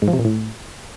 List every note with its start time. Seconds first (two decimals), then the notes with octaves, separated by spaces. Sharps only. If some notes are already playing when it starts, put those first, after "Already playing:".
0.02 G#2
0.08 F3
0.13 C3
0.19 A#2
0.25 A2